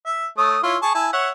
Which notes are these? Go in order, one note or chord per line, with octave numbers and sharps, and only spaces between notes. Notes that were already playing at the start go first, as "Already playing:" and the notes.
E5
A3 C#5 D#6
E4 F4 C#5
G#4 A5 C#6
E4 G#5 A5
C#5 E5 F#5